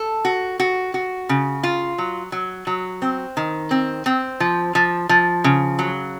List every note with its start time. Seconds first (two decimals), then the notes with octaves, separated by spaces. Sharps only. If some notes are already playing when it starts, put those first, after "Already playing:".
Already playing: A4
0.25 F#4
0.60 F#4
0.94 F#4
1.29 C#3
1.63 F4
1.98 F#3
2.32 F#3
2.67 F#3
3.02 C4
3.37 D#3
3.71 C4
4.06 C4
4.40 F3
4.75 F3
5.09 F3
5.44 C#3
5.79 F#3